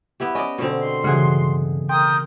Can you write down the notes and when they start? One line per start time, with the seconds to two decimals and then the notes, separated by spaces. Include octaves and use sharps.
0.20 B3 E4 G4
0.35 C#4 D5 D#5
0.58 B2 D3 C4
0.78 C6
1.04 G2 C#3 E3 F#3 G#4 F#5
1.89 A#4 G5 C6 D#6 G6